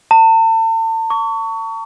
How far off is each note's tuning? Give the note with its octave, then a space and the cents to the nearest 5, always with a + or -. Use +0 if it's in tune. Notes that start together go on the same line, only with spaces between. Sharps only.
A5 +40
C#6 +25